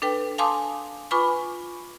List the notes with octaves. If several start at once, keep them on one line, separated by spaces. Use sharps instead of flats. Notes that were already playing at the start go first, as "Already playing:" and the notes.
D4 A4 B4 G5
F5 G#5 A5 C6 D6 D#6
F4 B4 G#5 B5 C#6 D6